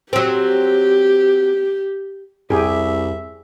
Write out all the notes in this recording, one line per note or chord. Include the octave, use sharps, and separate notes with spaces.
F#3 C4 G4
C2 F2 G4 G#4 E5